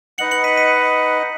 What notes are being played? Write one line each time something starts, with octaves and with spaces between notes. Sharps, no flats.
D#4 B4 D#5 F#5 C#7 F#7
C#7 F#7
B6 D#7
B6 D#7